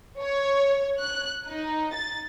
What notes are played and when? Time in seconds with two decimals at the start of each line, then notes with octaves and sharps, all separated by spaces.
0.19 C#5
0.99 F#6
1.49 D#4
1.94 A6